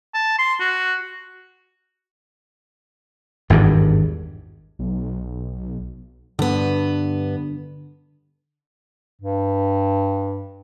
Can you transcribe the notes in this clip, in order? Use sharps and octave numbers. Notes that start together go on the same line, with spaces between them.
A5
C6
F#4
G#1 E2 G2
B1
G2 D3 B3
G2